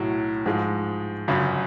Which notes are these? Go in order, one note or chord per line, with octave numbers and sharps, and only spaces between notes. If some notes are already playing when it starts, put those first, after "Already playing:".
Already playing: B1 A2 F#3
G#2 F3 G#3
G1 F#2 C#3